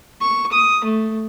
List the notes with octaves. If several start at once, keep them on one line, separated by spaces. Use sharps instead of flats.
C#6
D#6
A3